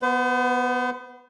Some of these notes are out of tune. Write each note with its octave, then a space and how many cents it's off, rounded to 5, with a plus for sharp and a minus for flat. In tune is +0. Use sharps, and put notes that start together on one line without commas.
B3 +0 C5 -45